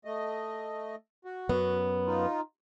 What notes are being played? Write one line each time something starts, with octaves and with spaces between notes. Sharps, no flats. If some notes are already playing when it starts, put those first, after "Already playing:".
A3 D#5
F#4
F#2 B3
D#4 F4